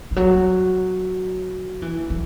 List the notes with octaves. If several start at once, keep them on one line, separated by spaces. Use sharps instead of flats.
E3
F#3
E3
E3